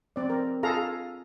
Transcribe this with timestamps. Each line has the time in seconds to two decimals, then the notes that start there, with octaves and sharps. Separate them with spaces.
0.16 C4 D5
0.29 A#4
0.63 F4 G#4 A4 F5 A#5